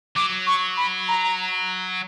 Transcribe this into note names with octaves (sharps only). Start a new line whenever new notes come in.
F#3 D6
C#6
B5
A#5